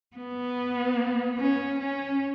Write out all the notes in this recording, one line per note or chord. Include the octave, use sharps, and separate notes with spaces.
B3
C#4
C#4